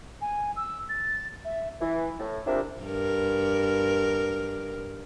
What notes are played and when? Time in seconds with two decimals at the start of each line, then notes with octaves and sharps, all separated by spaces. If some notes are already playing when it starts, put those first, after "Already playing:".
0.21 G#5
0.56 E6
0.89 A6
1.45 E5
1.81 E3
2.20 A2
2.46 C2 C3 F3 A#3 D4 E5
2.81 G2 A#4